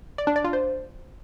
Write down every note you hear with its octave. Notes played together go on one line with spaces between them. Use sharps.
D5
D4
D5
F4
C5